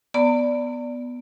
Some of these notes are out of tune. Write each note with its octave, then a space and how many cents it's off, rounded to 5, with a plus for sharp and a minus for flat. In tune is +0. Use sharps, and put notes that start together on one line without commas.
B3 +0 D5 +0 A#5 -45